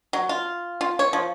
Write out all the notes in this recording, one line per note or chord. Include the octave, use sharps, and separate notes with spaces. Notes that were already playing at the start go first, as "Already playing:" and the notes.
F#3
F4
F4
C#5
F3